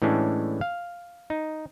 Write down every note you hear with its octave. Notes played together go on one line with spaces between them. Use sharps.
A2 E3 G#3 C#4 D4
F5
D#4